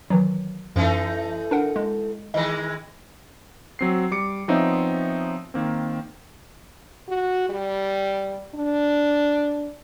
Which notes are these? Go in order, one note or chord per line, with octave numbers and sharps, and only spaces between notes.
D#3 E3 F#3
F#2 E3 A3 D#4
D4 A#4 F#5
G#3
D#3 E3 G#3 D#5
F#3 C4 C7
G3 D6 C#7
F3 B3 C4 D#4 C#5 E5
D#3 A#3 C4
F#4
G3
D4